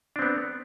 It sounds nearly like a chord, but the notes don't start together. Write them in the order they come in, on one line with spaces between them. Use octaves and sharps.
D4 C4 B3